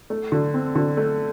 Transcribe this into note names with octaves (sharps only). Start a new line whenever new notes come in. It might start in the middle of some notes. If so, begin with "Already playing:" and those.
A3
D3
C4
D3
A3